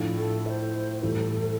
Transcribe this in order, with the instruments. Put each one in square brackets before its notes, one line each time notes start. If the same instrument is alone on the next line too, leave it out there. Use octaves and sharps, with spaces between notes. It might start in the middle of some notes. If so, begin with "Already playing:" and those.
Already playing: [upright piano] A2 F3 A3 D4 F4
[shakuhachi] A4
E5
C5
[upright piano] A2 E3 G3 [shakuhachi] A4